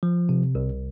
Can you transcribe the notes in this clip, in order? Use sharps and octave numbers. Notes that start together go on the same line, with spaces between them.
F3
C3
C2